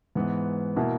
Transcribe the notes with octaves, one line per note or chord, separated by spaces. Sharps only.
G#2 E3 B3
B2 A#3 E4